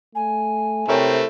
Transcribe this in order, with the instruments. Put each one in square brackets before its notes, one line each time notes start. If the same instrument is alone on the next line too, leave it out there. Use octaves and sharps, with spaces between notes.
[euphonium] A3 [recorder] G#5
[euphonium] C3 [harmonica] A3 C4 E4 [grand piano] A#4 C#5 G5